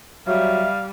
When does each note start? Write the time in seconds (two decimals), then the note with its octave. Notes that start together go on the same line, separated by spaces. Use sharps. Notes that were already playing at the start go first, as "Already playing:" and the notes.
0.27 F#3 G3 E5 F5